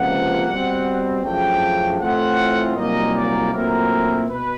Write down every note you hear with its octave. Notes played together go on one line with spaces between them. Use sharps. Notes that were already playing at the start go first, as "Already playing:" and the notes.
Already playing: C#2 C3 F3 A#3 F#5
B2 G3 C4
F#2 C#3 F3 A3 D4 G5
A2 E3 A3 C4 F4 F#5
C2 A#2 F#3 A#3 D#4 D#5
D5
A#2 F#3 A3 C4 E4 A#4
B2 B4